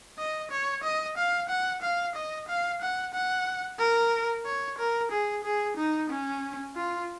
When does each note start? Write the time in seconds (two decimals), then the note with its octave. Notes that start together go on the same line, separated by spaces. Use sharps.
0.18 D#5
0.51 C#5
0.83 D#5
1.17 F5
1.49 F#5
1.82 F5
2.15 D#5
2.48 F5
2.81 F#5
3.14 F#5
3.79 A#4
4.45 C#5
4.78 A#4
5.11 G#4
5.44 G#4
5.77 D#4
6.09 C#4
6.76 F4